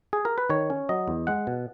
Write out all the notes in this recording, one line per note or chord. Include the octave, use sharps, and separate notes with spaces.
G#4
A#4
B4
D#3 C#5
C#4
F#3 D#5
E2
G#3 F#5
B2